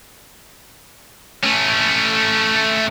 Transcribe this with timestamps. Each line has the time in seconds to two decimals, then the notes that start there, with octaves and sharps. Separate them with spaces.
1.44 A3 C#4